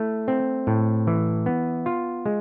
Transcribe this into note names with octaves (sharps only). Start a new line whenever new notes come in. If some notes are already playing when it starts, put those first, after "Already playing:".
Already playing: A3 E4
C4
A2
E3
B3
F4
G#3